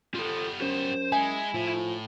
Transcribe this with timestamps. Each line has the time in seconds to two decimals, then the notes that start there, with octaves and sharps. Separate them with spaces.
0.14 G3 B3 F4 A4
0.61 F#2 C5
1.12 G#3 E4 G#4 E5 G#5
1.54 A2 F3